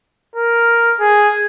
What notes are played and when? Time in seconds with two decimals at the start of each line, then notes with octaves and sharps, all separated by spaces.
0.36 A#4
1.00 G#4